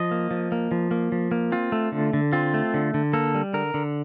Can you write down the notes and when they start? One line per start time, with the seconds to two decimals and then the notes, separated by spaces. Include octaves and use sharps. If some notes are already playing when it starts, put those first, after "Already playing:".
Already playing: F3 D#5
0.11 A#3
0.31 F3
0.52 A#3
0.71 F3
0.91 A#3
1.12 F3
1.31 A#3
1.52 C4 F4
1.72 A3
1.92 D3
2.13 D3
2.33 C4 F4
2.54 A3
2.74 D3
2.94 D3
3.13 A#3 A4
3.35 G3
3.54 D3 A#4
3.74 D3